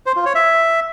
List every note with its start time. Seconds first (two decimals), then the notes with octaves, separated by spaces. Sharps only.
0.06 C5
0.16 F4
0.25 C#5
0.35 E5